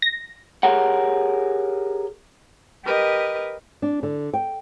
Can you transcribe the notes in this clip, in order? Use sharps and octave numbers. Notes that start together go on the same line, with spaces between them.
A#6
G4 G#4 A#4 C#5 F#5
G4 A#4 B4 D#5
D4
D3
G5